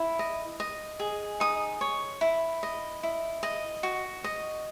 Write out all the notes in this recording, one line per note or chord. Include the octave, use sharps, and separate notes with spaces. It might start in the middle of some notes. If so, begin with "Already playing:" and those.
Already playing: E4
D#5
D#5
G#4
D#4 D#6
C#5
E4
D#5
E4
D#5
F#4
D#5